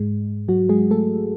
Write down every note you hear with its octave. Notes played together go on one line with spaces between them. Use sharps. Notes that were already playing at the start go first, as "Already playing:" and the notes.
Already playing: G#2 G#3
F#3 F#4
G#3 G#4
A3 A4